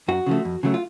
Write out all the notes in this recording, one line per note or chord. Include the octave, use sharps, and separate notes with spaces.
F#2 F#4
C#3 F3 A3
F2
C#3 F#3 A3
F4